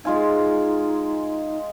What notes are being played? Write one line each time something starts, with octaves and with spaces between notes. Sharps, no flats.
G#3 D#4 F4 G#5